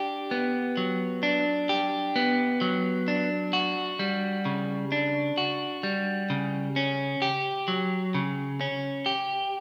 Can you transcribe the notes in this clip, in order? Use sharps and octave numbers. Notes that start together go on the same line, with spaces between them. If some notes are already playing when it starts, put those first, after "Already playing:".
Already playing: D4 G4
B3
F#3
D4
G4
B3
F#3
D4
F#4
G3
C#3
D4
F#4
G3
C#3
C#4
G4
F#3
C#3
C#4
G4